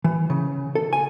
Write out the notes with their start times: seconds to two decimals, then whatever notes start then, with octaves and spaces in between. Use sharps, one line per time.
0.04 E3
0.30 C#3
0.75 A4
0.93 G#5